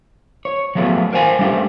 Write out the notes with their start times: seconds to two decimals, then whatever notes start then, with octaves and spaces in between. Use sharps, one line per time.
0.45 C#5
0.75 F3 F#3 A3 B3 G#4
1.13 A#4 C5 F5 G#5
1.39 G3 A3 D4 G4